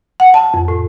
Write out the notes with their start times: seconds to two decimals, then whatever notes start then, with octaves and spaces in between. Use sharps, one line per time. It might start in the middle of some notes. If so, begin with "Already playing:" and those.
0.20 F#5
0.34 A5
0.54 F2
0.68 A2